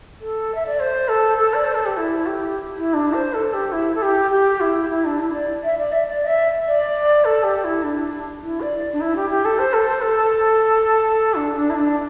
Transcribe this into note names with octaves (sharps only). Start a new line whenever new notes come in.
A4
E5
D5
C5
A4
A4
D5
C5
A4
G4
E4
G4
E4
D4
C5
A4
G4
E4
A4
G4
G4
E4
E4
D4
E4
D5
E5
D5
E5
D5
E5
D5
A4
G4
E4
D4
E4
D5
D4
E4
G4
G4
A4
C5
A4
C5
A4
D4
D4
E4
D4